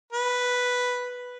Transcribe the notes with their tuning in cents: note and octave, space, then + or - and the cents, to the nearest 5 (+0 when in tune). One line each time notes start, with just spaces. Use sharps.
B4 +0